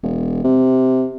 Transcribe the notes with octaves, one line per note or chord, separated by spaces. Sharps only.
E1
C3